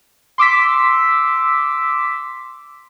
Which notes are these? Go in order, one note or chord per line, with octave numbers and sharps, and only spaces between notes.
C6 D6 E6 B6